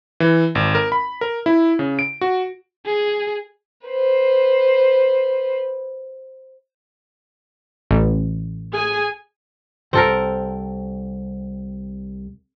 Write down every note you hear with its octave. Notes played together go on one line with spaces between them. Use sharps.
E3
G#1
A#4
B5
A#4
E4
C#3
D7
F#4
G#4
B4 C5
A1
G#4 G#5
C2 C4 A4 A#4